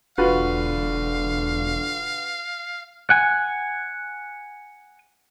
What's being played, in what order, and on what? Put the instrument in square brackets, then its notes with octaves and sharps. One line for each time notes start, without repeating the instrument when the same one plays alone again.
[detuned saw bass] E1 [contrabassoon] D3 [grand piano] F4 F#4 B4 [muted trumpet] F5
[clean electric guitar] F#5 G#5